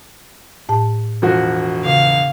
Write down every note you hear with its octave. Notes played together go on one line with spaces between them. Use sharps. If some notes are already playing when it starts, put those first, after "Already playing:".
A2 A5
E1 F3 F#4
C#3 F5